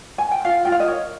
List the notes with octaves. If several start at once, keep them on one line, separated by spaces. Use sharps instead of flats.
G#5
G5
F4 F5
F4 G5
F5
D#5
A#4 C#5